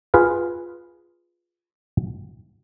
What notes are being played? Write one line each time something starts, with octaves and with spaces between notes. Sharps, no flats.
F4 G#4 B4 F5